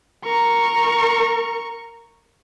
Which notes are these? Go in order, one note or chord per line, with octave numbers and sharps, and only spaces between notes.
A#4 C#6